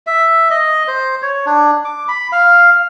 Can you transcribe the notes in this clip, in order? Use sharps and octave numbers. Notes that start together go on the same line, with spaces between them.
E5
D#5
C5
C#5
D4
D6
B5
F5